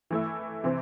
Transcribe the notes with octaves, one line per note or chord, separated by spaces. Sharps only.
E3 A3 E4
C3 E3 C4